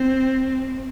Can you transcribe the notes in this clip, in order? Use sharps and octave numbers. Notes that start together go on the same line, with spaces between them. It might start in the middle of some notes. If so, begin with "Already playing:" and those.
Already playing: C4